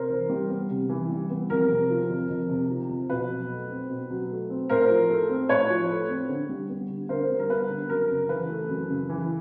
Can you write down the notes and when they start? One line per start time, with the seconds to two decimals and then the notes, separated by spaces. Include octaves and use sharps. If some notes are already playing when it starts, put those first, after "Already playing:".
Already playing: C3 A#4 C5
0.09 E3
0.29 G3
0.50 B3
0.70 C3
0.89 E3
1.09 G3
1.30 B3
1.50 F2 A#4
1.71 C3
1.90 F3
2.10 F2
2.30 F2
2.50 C3
2.70 F3
2.90 F2
3.10 B2 B4
3.30 F#3
3.50 A3
3.70 C4
3.90 B2
4.10 F#3
4.29 A3
4.50 C4
4.69 A2 A#4 C5
4.89 F3
5.09 A3
5.29 C4
5.49 A2 B4 C#5
5.70 F3
5.89 A3
6.09 C4
6.29 D3
6.49 G3
6.69 B3
6.89 D3
7.09 D3 A#4 C5
7.30 G3
7.39 A#4
7.49 B3 B4
7.70 D3
7.89 F#2 A#4
8.10 C#3
8.29 E3 B4
8.49 A3
8.69 F#2
8.89 C#3
9.10 E3